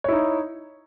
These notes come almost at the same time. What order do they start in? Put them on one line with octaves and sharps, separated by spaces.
C#5 E4 D#4